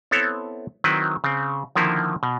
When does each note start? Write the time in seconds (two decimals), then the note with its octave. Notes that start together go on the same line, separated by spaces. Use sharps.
0.11 B3 C4 E4 A4 C#5
0.84 D#3 F#3 C4 E4 B4
1.24 C#3 C4
1.76 D3 D#3 F3 A#3 E4
2.23 B2